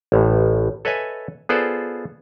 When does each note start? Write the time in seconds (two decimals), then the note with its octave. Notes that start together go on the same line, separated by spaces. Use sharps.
0.12 A1 A2
0.85 A4 B4 C#5 D#5 E5 G#5
1.49 B3 F4 G#4 A4 C5 D5